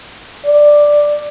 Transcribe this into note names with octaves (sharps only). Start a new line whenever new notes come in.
D5